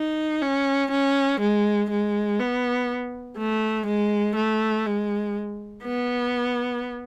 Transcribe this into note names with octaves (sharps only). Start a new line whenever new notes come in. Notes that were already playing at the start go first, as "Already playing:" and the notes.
Already playing: D#4
C#4
C#4
G#3
G#3
B3
A3
G#3
A3
G#3
B3